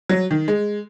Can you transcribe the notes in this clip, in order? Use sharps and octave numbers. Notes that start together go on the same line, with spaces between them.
F#3
D#3
G#3